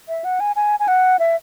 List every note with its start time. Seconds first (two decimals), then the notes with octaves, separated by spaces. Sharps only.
0.09 E5
0.24 F#5
0.40 G#5
0.56 G#5
0.80 G#5
0.88 F#5
1.19 E5